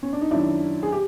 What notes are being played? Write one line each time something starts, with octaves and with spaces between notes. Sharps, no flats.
C#4
D4
D#4
F#2 D#3 F#3 D4 E4
G#4
G4